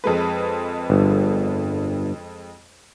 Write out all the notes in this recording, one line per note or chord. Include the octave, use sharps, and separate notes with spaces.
F2 G#3 B4
G1